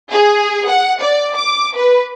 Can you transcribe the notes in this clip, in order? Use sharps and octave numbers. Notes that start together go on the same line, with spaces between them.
G#4
F#5
D5
D6
B4